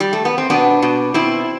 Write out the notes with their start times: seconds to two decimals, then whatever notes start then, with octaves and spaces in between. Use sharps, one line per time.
0.00 G3
0.13 A3
0.25 B3
0.38 C4
0.50 B2 B3 D4
0.82 B2
1.14 B2 C4 E4